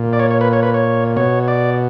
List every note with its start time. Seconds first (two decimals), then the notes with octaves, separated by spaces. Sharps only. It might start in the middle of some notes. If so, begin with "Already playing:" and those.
Already playing: A#2
0.13 D5
0.19 C#5
0.31 C#5
0.41 B4
0.53 C#5
0.63 B4
0.74 C#5
1.16 B2 C#5
1.48 D5